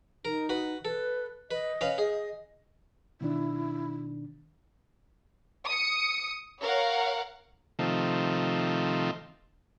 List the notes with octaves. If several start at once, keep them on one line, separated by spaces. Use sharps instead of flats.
D#4 A#4
F#4 B4
A4 B4
B4 D#5
C#4 B4 F5
G#4 D#5
B2 D#3 D4 E4
D#6 C#7
A#4 C#5 F5 F#5
C3 D#3 F3 A3